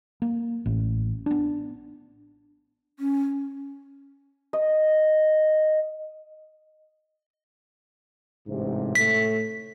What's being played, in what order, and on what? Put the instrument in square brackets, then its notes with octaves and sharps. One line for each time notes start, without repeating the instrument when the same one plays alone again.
[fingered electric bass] A#3
A1
B3 D4
[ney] C#4
[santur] D#5
[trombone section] A1 G#2 C3
[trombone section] A2 A3 [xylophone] B6